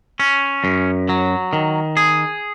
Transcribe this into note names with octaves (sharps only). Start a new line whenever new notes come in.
C#4
F#2
F#3
D#3
G#4